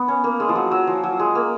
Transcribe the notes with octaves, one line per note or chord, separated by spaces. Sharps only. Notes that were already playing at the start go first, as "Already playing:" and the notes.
Already playing: B3
C#4
A#3
G#3
F3
F#3
F#3
F3
F#3
G#3
A#3